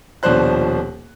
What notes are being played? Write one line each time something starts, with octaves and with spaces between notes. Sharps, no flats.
D#1 B2 F3 D4 C5 F#6